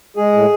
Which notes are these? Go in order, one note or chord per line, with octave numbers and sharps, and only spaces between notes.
G#3 G#4
A2